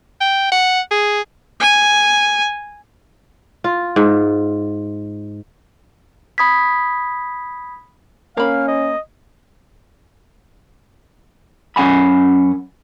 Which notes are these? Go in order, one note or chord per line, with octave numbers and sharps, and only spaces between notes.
G5
F#5
G#4
G#5
F4
G#2
B5 D#6 G#6 B6
A#3 C#4 F5 B5
D#5
F#2 C#4 F#5 G#5 B5